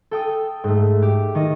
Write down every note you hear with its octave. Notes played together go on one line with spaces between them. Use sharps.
A4 G5 D#6
G#2 A3
G4
D#3 D#5